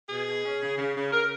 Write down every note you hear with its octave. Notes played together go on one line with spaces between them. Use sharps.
B2 G#4
B2
C#4
C#3
C#3
C#3
C#3 A#4